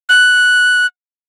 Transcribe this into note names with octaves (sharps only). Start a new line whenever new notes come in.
F#6